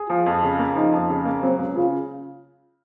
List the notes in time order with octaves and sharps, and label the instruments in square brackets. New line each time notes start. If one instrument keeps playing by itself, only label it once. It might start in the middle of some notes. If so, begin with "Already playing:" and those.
Already playing: [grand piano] G#4
[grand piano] F3 [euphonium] F4
[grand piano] F2
C#3
A#3
[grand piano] F3 [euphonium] D#4
[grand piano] F2
C#3
A#3
[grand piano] F#3 [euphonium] C4
[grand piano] C#2
[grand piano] C#3 [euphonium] F4